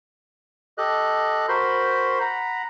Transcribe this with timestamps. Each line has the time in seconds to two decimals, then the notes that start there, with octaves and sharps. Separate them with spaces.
0.78 G4 A4 D#5 F#6
1.48 F#4 A#4 C5 B5 C6
2.21 F#5 A#5 B5